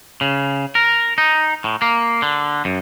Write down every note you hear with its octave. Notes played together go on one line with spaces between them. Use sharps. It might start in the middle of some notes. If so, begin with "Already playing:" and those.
C#3
A#4
D#4
A2
A#3
D3
F#2